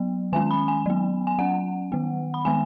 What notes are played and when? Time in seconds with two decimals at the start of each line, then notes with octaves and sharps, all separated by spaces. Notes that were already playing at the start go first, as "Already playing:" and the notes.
Already playing: F#3 B3
0.32 D#3 G#3 C#4 G#5
0.51 B5
0.68 G#5
0.86 F#3 B3
1.27 G#5
1.39 F#3 C#4 F#5
1.92 D#3 B3
2.34 B5
2.45 D#3 G#3 B3 G#5